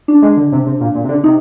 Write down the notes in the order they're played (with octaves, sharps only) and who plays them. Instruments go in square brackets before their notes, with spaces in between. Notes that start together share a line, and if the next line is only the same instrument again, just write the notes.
[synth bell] D4
[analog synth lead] G#3
D3
C3
C3
A#2
A#2
C3
D3
[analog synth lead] C3 [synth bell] D#4